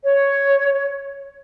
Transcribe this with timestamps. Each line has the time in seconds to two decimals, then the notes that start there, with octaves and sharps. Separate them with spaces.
0.05 C#5